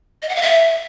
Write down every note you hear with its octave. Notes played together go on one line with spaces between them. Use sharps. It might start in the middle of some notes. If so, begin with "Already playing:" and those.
D#5
F#5
F5
E5